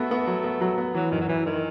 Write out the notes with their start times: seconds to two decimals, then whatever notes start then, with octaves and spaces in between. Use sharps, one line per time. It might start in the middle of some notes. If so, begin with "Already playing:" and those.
Already playing: A3 B3 F#4
0.11 B3
0.27 F#3
0.44 B3
0.61 F#3
0.78 B3
0.95 E3 F#3
1.11 F#2 D#3
1.21 F#3
1.28 F#2 E3
1.45 D#3 E3